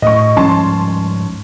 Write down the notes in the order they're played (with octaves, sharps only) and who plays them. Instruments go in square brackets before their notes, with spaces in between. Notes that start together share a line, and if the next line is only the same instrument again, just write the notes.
[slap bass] A2 [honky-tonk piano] D#5 C#6
[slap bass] G#2 F3 G3 [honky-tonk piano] C#4 A5 C6